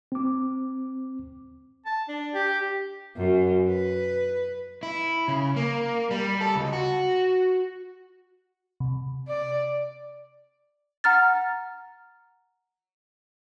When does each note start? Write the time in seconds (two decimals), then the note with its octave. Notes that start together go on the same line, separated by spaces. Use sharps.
0.12 C4 D6
1.86 A5
2.08 D4
2.34 G4
3.16 F#2
3.68 B4
4.83 E4
5.28 C#3
5.56 A#3
6.11 G3
6.41 A4
6.55 C#2
6.73 F#4
8.80 C3
9.28 D5
11.04 F#5 A#5 F6 A6